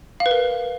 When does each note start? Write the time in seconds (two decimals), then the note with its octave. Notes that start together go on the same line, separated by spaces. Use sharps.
0.20 F5
0.26 B4
0.31 A#4